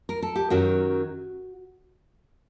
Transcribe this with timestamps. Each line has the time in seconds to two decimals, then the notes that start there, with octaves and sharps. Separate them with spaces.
0.09 A#4
0.22 A4
0.36 G4
0.50 F#2 D#3 F#3 F#4